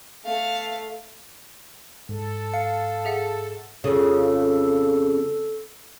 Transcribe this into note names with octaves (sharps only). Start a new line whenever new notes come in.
A3 F5
G#2 A4
F5 C#7
G#4 E5 F#5
F2 C#3 A4